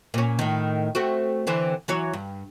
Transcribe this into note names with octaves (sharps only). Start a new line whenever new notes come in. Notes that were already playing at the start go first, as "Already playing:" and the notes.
A#2 C#4
A2 D#3
A3 C4 F#4
D3 E3 C4
E3 F#3 C#5
G2